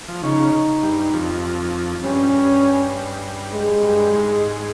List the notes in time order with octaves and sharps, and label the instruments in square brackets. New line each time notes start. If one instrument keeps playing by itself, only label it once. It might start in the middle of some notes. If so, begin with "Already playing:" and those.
[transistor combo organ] F3
[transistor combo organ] C#3 [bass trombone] D#4
[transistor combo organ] G2
F2
[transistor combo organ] G2 [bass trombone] C#4
[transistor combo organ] G2
[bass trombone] G#3
[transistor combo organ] G2
G#2